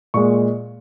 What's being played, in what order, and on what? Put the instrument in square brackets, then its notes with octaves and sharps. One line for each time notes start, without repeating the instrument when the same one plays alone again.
[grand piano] A#2 G#3 C#6